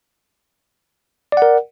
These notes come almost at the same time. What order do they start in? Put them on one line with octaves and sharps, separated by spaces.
D5 F#5 A#4